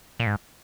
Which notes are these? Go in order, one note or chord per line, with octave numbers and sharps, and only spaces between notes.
A#2
G#2